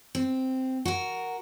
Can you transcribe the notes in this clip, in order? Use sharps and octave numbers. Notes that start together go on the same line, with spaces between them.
C4
F#4 A#4